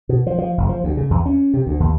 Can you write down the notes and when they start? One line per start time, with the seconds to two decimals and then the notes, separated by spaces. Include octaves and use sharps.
0.09 B2
0.27 F3
0.38 F3
0.58 F#1
0.69 F3
0.84 D2
0.97 C#3
1.10 E2
1.26 C#4
1.54 C3
1.67 D2
1.80 D#2